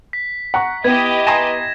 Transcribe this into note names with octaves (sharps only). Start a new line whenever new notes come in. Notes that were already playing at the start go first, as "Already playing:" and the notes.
B6
F#5 A#5 C#6
B3 E4 G4 D#5 G#6
G#5 A#5 C6 G#6 A#6 E7